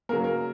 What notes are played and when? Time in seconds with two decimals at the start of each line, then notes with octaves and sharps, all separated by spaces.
0.09 C#3 F#3 A#3 A#4
0.24 A#4